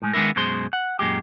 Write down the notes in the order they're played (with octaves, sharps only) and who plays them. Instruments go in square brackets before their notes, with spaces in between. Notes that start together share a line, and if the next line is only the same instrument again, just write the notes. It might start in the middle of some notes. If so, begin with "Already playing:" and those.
[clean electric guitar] A2 G#3
D#3 G#3 B3 D4 E4 A#4
F#2 B2 G#3 C5 C6
F#5
F#2 A#2 G#3 G4